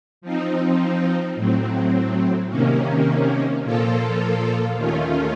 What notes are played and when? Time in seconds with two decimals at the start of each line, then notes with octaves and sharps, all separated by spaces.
0.22 F3 C4 D#4
1.35 A2 F#3 C4
2.49 C3 D#3 A#3 C#4
3.63 A#2 F3 A#3 F4 A4
4.76 D#2 D#3 A3 C#4 F4